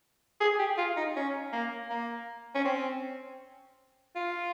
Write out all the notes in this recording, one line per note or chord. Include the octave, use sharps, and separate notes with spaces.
G#4
G4
F4
D#4
C#4
A#3
A#3
C#4
C4
F4